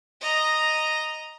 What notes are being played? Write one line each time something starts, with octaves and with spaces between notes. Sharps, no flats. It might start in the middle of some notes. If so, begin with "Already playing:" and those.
D#5 A#5